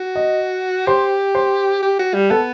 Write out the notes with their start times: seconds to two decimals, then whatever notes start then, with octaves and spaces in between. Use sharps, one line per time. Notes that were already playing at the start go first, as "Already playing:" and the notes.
Already playing: F#4
0.16 D#5
0.87 G4 C5
1.35 C5
1.83 G4
1.99 F#4
2.14 G3
2.30 B3 A4